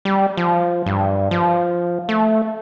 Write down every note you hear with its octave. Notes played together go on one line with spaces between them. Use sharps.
G3
F3
G2
F3
A3